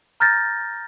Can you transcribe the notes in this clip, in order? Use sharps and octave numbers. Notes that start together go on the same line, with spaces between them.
A#5 F6 G6 A6 A#6